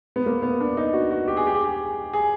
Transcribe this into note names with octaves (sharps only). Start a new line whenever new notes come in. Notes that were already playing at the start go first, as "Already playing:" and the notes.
B3
A#3
B3
D4
D#4
F#4
F#4
G4
G#4
G4
G#4
G4
G#4